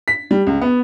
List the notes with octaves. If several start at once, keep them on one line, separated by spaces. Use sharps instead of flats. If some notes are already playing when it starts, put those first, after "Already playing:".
B6
G3
C#2
B3